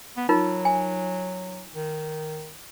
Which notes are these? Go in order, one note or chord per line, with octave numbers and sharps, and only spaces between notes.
B3
F#3 D#4 F4 A#4
G#5
D#3